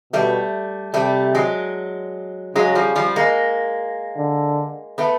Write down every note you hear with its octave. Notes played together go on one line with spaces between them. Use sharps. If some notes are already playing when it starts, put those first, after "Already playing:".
B2 G3 A3
C3 G3 A3
F#3 G#3
C#3 F#3 G#3
F3 G3
F3 G3
G#3 A#3
D3
A3 B3